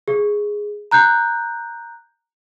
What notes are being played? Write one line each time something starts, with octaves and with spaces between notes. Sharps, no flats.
G#4
A#5 F#6 G6